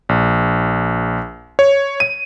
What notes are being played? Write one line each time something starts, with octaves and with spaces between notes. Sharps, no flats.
A#1
C#5
D#7